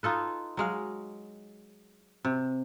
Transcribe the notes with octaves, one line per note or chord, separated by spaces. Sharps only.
D#4 F4 A4 B4
F#3 G#3 F5
C3